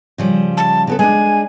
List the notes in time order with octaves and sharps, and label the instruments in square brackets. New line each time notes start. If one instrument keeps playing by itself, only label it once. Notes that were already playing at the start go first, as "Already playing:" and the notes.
[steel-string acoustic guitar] C#3 F3 G3
[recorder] A5
[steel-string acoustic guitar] C#3 B3 A4
[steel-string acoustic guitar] G#3 D4 [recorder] G#5